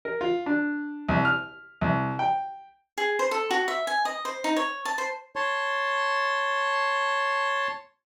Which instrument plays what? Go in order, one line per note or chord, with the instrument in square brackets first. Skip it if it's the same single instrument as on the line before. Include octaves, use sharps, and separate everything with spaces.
[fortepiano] A#4
F4
D4
C2
F6
C2
G5
[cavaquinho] G#4
C5
A4
F#4
E5
G#5
D#5
C5
D#4
C#5
A5
C5
[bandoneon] C#5 A5 C6